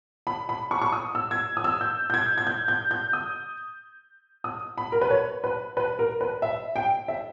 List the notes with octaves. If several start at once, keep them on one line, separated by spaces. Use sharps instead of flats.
B5
B5
C#6
C#6
D#6
E6
G#6
D#6
E6
G6
G6
G#6
G#6
G6
G6
G6
D#6
D#6
B5
A#4
B4
C#5
B4
B4
A#4
B4
E5
G5
E5